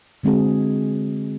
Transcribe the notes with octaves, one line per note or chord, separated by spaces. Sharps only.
D3 G#3 C4 F#4 G#4